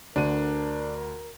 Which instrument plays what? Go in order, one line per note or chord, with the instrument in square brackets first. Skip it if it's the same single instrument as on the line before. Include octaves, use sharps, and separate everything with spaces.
[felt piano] D2 D3 D#7 [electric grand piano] D4 [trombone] A#4